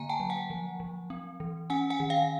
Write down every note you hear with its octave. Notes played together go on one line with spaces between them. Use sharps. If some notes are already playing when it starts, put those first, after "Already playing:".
Already playing: D3 A#3 G#5 A#5
G5 A5
F#3
F#5 G#5
F3
F3
C4
E3
C#4 F#5 G#5
F#5 G#5
D#3
F5 G5